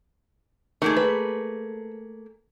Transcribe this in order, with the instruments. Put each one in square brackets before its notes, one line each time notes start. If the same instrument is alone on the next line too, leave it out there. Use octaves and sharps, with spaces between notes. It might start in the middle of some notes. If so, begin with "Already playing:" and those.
[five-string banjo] D#3 [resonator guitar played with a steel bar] A3 A#3 G#4
[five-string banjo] B4